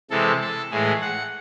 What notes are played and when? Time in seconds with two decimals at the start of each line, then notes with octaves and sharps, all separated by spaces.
0.10 C3 E3 G#3 A4
0.41 A4
0.71 A2 E3 G#3 G#4
1.02 F#5